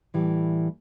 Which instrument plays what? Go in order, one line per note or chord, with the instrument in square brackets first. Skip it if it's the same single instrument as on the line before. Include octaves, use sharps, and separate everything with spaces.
[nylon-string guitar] A2 E3 G3